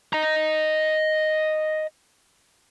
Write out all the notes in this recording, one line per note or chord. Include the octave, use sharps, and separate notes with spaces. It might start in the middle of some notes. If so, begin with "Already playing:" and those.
D#5 A#5